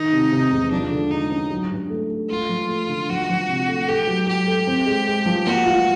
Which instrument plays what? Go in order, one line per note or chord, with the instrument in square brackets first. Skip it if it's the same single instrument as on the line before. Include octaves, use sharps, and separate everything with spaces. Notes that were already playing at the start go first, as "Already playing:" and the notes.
Already playing: [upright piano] D#3 [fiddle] D#4
[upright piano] C3
C3
E2
[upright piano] F3 [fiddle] D4
[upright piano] D3
[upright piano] G#3 [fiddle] D#4
[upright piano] C#4
F#3
G2
A3
A3
[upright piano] A3 [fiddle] F4
[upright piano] F3
A3
D3
[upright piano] F3 [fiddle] F#4
[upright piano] F3
C3
A3
[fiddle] G4 [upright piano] A4
[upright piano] F#3
[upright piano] F#3 [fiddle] G4
[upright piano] A4
C4
G#3
G#3
F3
[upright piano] A#3 [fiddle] F#4
[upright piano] F4